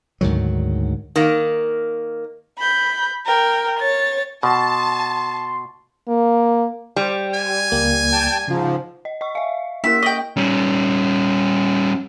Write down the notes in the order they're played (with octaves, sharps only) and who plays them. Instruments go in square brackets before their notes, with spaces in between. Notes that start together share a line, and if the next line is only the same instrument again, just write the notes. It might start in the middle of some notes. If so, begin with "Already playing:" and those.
[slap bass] D2 G#2 D#3 F#3
[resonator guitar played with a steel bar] D#3 A#3
[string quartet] B5 G6
A#4 G5
C#5 A6
[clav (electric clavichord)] B2 [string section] A5 [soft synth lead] C6
[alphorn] A#3
[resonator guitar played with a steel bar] G3 [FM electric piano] C5
[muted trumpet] G#5
[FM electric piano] C#2 A#3
[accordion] G5 A5
[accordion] G#2 F3 [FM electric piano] C#3 F4
[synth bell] D#5
D#5 C#6
E5 F5
[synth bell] A#3 E4 A#4 [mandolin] E5
[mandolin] D#5 G5 [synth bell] C#6 F#7
[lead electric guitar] G3 C#4